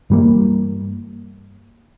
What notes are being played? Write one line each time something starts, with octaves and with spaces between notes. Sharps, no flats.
G2 E3 G3 A#3